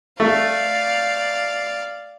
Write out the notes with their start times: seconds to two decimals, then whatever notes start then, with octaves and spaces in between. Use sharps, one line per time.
0.20 A3 D5 F5